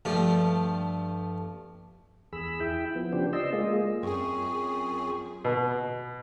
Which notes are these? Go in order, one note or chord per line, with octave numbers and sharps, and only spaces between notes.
G2 F3 A3
E2 G#4 B5 E6
E4 G5
F3 B3
C#3 F3 B3 D4 G4 C5
D5 D#5 C6 E6
G#3 A#3 F4 G#4 D#5
F#2 C4 F4 G#4 C#6
B2